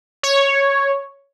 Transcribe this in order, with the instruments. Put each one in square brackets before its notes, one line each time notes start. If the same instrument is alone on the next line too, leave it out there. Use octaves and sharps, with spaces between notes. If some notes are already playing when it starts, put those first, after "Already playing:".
[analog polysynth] C#5